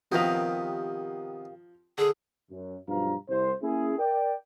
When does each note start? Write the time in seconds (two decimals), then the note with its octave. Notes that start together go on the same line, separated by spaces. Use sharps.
0.12 C3 D#3 F3 B3 G4 A#4 F5
1.98 D3 G#4
2.51 F#2
2.88 B1 G2 F3 F4 F5 A#5
3.29 C2 C5
3.62 A#3 C#4 E4 G#4
3.99 A#4 D5 G5